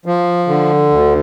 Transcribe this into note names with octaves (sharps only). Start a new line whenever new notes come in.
F3
D3
D2